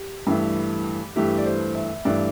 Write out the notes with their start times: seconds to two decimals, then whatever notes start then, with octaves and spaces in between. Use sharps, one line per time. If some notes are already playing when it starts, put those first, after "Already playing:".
Already playing: G4
0.27 G2 E3 A3
1.16 G2 E3 A3 G4
1.38 D5
1.46 C5
1.75 E5
2.05 G2 E3 A3 D5